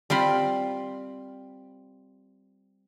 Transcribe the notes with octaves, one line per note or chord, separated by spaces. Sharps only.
G3 C4 F4 B5